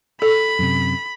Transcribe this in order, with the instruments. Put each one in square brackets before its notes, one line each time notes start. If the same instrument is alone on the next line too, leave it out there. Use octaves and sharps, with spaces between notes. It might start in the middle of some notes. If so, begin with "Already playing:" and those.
[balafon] A4 [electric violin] B5
[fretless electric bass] F#2 C3